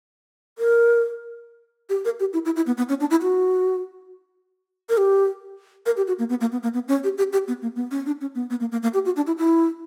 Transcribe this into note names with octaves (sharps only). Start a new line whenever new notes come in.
A#4
G4
A#4
G4
E4
E4
E4
B3
B3
C#4
D4
E4
F#4
A#4
G4
A#4
G4
F#4
A#3
B3
A#3
B3
A#3
B3
C#4
G4
G4
G4
B3
A#3
B3
C#4
D4
C#4
B3
B3
A#3
A#3
A#3
G4
F#4
D4
E4
E4